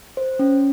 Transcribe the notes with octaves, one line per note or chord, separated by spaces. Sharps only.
C5
C#4